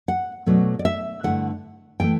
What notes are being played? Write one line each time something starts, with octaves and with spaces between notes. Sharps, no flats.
F#5
B2 F#3 A3 D4
D5
E5
G2 D3 A3 E4 F#5
C3 E3 A3 G5